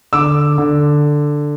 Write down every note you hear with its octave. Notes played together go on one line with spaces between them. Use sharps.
D3 D6 E6
D3